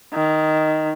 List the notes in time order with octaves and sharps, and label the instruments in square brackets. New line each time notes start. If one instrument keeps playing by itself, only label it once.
[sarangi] D#3